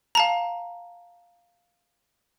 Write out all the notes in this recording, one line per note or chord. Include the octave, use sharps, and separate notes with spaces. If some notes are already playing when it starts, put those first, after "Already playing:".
F5 A5 A#5